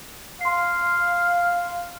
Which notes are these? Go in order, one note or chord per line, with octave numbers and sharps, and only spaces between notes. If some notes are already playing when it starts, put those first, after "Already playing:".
F5 C6 C7